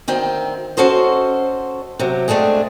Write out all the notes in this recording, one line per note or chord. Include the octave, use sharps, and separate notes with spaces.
D2 D#3 C4 G5
C#4 F#4 A4 C5 D#5
C3 F#3
G#3 A3 C4 D4 G#4